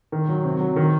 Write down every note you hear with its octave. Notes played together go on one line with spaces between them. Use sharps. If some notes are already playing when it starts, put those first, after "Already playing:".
D#3
F#3
C3
F#3
D#3